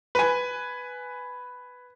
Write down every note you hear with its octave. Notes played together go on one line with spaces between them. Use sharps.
B4 G#5